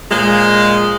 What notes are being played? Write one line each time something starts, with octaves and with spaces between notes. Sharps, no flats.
A#2 F3 G#3